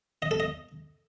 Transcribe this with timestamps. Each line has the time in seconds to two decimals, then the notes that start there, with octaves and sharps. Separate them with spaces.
0.22 D#5
0.31 A4
0.40 D#5